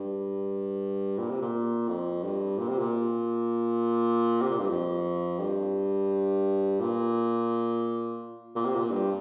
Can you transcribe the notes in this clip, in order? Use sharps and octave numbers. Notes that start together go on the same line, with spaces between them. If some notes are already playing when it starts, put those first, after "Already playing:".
Already playing: G2
A#2
C3
A#2
F2
G2
A#2
C3
A#2
C3
A#2
G2
F2
G2
A#2
A#2
C3
A#2
G2